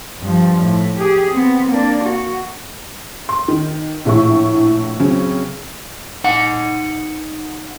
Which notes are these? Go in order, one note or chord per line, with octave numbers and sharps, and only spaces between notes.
G2 F3
A2
G4 G#4
B3 C4
A#3 D4
F#4
C6
D#3
A#1 A2 E4 C#6
C#3 F#3 C4 C#4
D#4 F#5